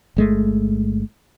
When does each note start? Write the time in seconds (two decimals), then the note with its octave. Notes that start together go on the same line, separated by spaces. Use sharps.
0.16 G1 G#3 A3